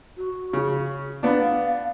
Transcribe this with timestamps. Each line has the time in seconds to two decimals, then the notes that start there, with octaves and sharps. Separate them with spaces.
0.17 F#4
0.53 C#3
1.23 B3 D4 F5